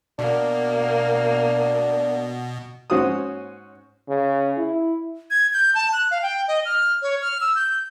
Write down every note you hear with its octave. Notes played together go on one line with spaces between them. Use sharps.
B2 A#3 D4
G#2 C#4 F#4 C5 C#5 D#6
C#3
E4
G#6
G6
A5
F#6
F5
G5
D#5
F6
C#5
F6
E6
G6